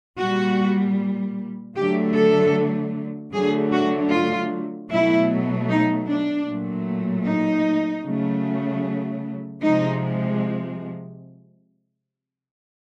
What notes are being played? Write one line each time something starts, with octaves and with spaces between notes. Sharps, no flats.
A#2 G3 F#4
D3 F#3 A3 G4
A4
D3 F#3 A3 G#4
F#4
F4
B2 F#3 A3 E4
D#4
D4
A#2 F#3 A3
D#4
C#3 F#3 A3
C3 F3 G#3 D#4